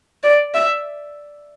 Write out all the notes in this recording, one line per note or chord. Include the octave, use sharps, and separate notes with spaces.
D5
E5